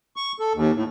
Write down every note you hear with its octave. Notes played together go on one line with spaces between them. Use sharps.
C#6
A4
D#2
A2